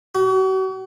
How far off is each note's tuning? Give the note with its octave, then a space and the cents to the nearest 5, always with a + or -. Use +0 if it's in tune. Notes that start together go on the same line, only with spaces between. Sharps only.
F#4 +40